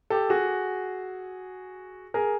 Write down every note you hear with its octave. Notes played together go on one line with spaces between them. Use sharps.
G4 A4
F#4 G#4
G#4 A#4